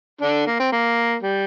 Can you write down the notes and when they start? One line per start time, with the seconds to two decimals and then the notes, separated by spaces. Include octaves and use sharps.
0.21 D3 D4
0.46 A#3
0.60 C4
0.72 A#3
1.23 G3